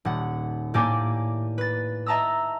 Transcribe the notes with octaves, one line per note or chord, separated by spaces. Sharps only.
D#1 F#5
A2 A#3 G4 D5 G#5 D6
B4 A6
D#5 E5 A5 A#5 D#6 E6